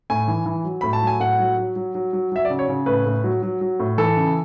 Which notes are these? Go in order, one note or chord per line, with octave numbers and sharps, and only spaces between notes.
A2 G#5
E3
E3
F#3
A2 B5
A5
F#3 G#5
A2 F#5
F#3
F#3
F#3
F#3
F#3
F#3 E5
D5
C#3
C#5
C#3
A2 B4
A2
F#3
F#3
F#3
A2
E3 A4
C#3